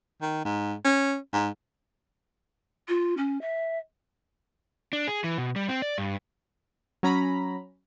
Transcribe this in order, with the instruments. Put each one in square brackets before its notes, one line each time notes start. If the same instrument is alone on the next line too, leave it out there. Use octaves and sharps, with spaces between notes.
[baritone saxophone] D#3
G#2
C#4
G#2
[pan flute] F4
C#4
E5
[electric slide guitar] D4
G#4
E3
B2
G3
C4
D5
G2
[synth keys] F#3 C#4 A#5 B5